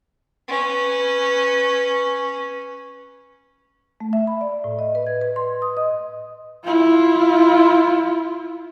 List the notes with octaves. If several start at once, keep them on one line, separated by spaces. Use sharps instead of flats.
C#4 B4
A3
E5
B5
D5
A2
D#5
B4
G#6
B4
C6
D#6
D#5
E4 F4